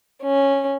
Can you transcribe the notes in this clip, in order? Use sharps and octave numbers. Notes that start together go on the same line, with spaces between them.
C#4